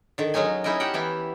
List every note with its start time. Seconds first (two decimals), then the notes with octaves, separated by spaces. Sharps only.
0.18 D3 D#3
0.34 F#3 G#3 C#4 D#4 G#5
0.64 C#4 D#4 E4 A#4 D#5
0.80 G4 E5 F#5 G5
0.94 E3 B3 E4